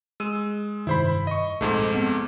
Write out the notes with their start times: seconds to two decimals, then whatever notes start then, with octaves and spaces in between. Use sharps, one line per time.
0.20 G#3 E6 D#7
0.87 F1 G2 D#3 E4 C5 B5
1.27 D#5 C#6
1.61 A#1 F2 G#2 A3
1.94 B3 C4